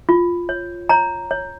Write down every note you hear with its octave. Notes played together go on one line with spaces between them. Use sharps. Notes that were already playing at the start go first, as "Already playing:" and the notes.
F4
C#5
C#5 A#5
C#5